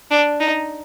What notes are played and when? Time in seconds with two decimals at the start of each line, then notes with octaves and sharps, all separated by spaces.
0.11 D4
0.40 D#4